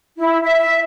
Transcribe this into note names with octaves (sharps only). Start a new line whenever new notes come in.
E4
E5